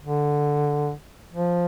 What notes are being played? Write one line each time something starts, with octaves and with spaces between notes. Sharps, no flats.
D3
F3